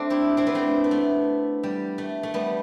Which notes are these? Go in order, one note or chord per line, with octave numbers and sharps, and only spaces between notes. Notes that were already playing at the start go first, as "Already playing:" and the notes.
Already playing: A3 C4 D4
E4 G4
C4 E4
B3 D4
A3 C4
B3
A3
G3
A3
A3
G3 B3